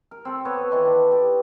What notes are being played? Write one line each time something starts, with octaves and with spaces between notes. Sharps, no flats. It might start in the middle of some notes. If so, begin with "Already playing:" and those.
A#4
C4 A4
B3 A4 B4 C#5
D#3 E3 D4
D4
G4